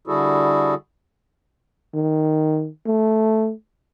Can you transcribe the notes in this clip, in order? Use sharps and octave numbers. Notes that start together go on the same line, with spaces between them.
D3 G3 E4 F#4 G#4 A4
D#3
A3